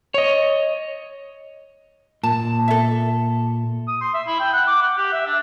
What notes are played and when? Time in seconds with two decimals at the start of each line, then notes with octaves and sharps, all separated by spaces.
0.14 C#5 D#5
2.23 A#2 A5
2.68 A4 E5
3.88 D#6
4.01 C6
4.14 E5
4.27 E4
4.39 G5
4.53 F#5
4.67 D6
4.82 F#5
4.97 G4
5.13 E5
5.26 D4